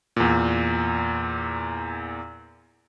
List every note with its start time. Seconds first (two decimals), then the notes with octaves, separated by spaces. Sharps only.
0.16 E2 A#2